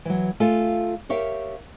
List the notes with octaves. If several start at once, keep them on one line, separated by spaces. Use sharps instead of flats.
E3 F#3
A3 F4 A4 F5 G#5
G4 A#4 C#5 E5 F5